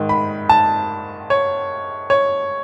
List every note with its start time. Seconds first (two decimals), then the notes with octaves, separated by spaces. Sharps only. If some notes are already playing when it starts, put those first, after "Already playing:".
Already playing: G#2 D#3
0.09 B5
0.49 A5
1.30 C#5
2.10 C#5